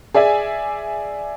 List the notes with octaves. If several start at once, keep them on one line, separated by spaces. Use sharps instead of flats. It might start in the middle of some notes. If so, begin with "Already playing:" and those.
G#4 D5 E5 G#5